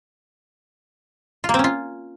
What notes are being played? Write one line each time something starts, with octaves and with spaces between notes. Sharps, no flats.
F4
A#3
C4
C#4
F4